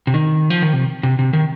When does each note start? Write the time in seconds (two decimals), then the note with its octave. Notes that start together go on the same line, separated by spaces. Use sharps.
0.07 C3
0.14 D#3
0.50 F3
0.62 D#3
0.73 C3
1.03 C3
1.19 C3
1.33 D#3